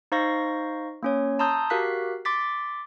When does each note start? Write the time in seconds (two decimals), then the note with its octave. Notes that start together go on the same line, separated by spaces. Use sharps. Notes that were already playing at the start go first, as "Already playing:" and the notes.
0.12 D#4 C5 F5 C#6 A#6
1.03 A#3 C#4 C#5
1.39 A5 A#5 C6 D#6 E6 G6
1.70 F#4 G4 A#4 F5 F#6 B6
2.25 C6 D6 A6 B6